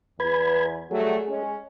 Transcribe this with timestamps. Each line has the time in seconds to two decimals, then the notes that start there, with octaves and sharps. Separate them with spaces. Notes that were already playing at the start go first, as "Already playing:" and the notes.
0.20 E2 B4 B5 G#6
0.91 F#3 G3 A3 G#4
1.29 G#3 C#4